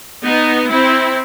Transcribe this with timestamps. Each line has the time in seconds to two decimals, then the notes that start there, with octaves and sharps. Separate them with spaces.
0.24 B3 D#4
0.70 C4 E4